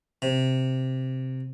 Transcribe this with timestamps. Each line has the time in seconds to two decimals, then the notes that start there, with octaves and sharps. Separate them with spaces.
0.22 C3